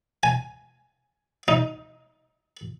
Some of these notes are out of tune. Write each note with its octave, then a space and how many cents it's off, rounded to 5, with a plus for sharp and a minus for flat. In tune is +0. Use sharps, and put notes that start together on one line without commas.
G#5 +5
D#4 +10